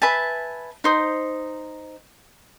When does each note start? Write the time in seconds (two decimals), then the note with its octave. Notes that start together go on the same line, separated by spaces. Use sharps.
0.02 B4 E5 G#5 A5
0.84 D#4 C5 D#6